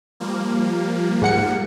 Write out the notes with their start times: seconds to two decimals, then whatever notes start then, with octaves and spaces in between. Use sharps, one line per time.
0.20 F3 G3 A#3
1.22 G#2 F#5 C#7